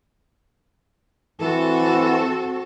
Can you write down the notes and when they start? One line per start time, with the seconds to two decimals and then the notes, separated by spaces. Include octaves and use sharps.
1.41 E3 C4 F#4 A4